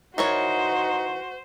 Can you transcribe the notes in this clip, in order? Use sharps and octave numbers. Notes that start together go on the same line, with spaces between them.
E3 D#4 F#4 A#4 C5 C#5